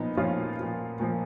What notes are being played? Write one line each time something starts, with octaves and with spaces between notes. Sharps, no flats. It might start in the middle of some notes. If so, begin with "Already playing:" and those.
Already playing: A#2 F3 B3 D#4
A#2 F3 C#4 F4
A#2 F3
A#2 F3